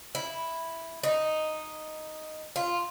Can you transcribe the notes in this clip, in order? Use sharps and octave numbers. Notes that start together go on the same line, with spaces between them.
E4
D#4
F4